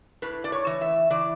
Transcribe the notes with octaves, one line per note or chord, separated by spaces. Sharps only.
A2 B4
D5
C#5
E3
E5
E3 D5